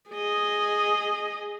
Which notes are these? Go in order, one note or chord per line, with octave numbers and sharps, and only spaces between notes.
G#4 D#5